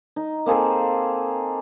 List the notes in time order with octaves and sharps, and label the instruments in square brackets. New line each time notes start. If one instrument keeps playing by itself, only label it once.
[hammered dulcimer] D#4
A#3 C4 G#4 A4